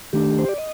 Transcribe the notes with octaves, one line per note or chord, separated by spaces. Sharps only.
D#3 A3 D4 G4
C5
D5
D#5